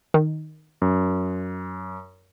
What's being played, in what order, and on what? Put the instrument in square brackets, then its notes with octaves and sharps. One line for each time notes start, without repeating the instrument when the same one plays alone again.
[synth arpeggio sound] D#3
[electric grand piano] F#2